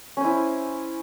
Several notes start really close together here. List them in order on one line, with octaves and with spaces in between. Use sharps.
C#4 C5 E4